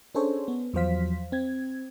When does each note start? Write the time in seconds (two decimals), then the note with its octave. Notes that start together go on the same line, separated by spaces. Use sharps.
0.15 C#4 D4 G#4 A4 C5 C#5
0.48 B3
0.74 E2 F3 F#3 C5 F5 B6
1.32 C4 G#6